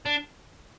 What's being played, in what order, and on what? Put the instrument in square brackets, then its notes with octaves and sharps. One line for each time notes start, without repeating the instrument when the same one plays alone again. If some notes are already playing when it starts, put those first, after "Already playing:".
[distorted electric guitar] D4